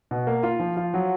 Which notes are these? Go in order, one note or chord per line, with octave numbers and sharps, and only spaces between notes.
B2
A#3
F4
F3
F4
F#3